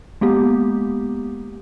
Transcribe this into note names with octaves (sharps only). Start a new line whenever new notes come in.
G#3 A#3 B3 G4